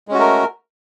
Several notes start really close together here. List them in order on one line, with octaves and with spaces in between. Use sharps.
G#3 C#4 F#4 A3 A#4